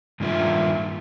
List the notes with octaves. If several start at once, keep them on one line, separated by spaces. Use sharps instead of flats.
G2 D#3 A#3 D4 F4 E5